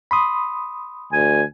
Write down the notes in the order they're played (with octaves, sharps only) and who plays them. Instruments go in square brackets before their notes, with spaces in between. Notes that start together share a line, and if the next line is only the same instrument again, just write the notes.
[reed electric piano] B5 C6 D#6
[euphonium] D2 [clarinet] G#5